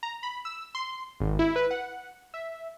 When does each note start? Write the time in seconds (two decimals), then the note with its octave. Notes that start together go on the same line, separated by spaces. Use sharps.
0.03 A#5
0.23 B5
0.45 E6
0.75 C6
1.20 G#1
1.39 E4
1.56 B4
1.71 F#5
2.34 E5